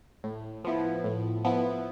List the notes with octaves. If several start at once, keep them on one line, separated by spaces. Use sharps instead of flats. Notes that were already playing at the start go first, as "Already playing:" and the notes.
A2
F3 B3 E4
A2
F3 B3 E4